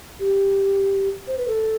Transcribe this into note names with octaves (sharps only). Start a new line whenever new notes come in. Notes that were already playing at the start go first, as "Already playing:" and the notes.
G4
C5
B4
A4